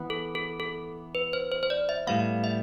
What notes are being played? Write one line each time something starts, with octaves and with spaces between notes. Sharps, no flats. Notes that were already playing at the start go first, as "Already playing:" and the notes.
Already playing: E3 B3
A4
A4
A4
B4
C5
C5
C5
D5
E5
A2 G3 B3 F5
E5